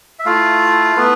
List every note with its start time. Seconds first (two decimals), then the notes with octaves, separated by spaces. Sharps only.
0.19 E5
0.26 A3 E4 F4 F5
0.96 A3 B3 E4 B4